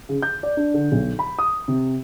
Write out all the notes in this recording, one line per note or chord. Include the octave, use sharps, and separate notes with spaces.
C#3
G6
D5
D4
D3
B1
B5
D#6
C3